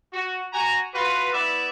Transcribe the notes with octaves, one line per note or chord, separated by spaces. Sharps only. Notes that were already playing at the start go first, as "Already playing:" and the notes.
F#4
F#4 G#5 A#5
F4 F#4 B4
B3 E4 D5 E5